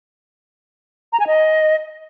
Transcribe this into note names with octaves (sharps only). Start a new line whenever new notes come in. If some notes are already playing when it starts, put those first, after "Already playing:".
A#5
G#5
D#5